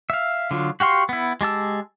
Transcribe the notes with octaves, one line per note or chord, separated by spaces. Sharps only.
E5 F5
D3 F#3 F4
F#4 G4 F5 C6 C#6
B3 E4
G#3 G4 A5 E6